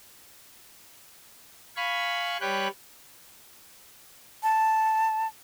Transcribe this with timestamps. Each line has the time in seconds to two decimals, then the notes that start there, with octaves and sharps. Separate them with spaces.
1.77 F5 G#5 B5 C#6
2.41 G3 B4 C#5 G5 F#6
4.43 A5